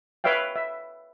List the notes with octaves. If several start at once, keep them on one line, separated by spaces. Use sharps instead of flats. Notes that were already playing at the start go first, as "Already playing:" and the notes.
B4 C#5 E5 F5 G5
E5